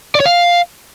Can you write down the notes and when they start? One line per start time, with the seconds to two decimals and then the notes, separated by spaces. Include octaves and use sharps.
0.15 D5
0.20 C#5
0.26 F5